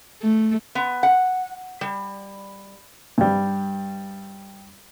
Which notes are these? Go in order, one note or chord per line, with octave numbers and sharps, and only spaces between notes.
A3
B3
F#5
G3
G2 G3